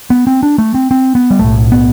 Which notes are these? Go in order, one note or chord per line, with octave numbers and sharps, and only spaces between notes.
B3
C4
D4
A3
C4
C4
B3
G3
B1 A2 A3
B3